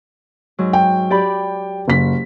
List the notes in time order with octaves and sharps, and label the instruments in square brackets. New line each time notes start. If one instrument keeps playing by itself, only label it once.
[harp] G#2 F#3
[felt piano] G5
[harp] G4 D5 B5
[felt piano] F#1 B6